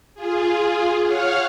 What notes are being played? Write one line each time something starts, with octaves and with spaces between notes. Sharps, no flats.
F4 G#4
C#5 F5 F#5 F6